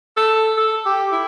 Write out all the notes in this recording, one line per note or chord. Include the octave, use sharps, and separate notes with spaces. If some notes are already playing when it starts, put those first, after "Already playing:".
A4
A4
G4
E4